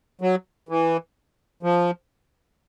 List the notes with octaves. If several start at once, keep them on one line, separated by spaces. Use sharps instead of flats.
F#3
E3
F3